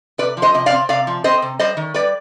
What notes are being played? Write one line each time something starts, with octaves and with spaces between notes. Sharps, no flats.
C3 B4 D5
F3
C5 D#5
C3 D#5
D5 F5
C4
C3 D5 F5
F3
C4 C5 D#5
C3
G3 C5 D#5
D#3
G3 B4 D5